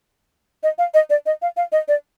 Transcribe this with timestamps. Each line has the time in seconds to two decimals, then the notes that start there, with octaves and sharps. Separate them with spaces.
0.63 D#5
0.78 F5
0.94 D#5
1.10 D5
1.26 D#5
1.42 F5
1.57 F5
1.72 D#5
1.88 D5